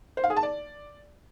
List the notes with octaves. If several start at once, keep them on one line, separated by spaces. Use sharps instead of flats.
C5
F5
G#4
A5
D5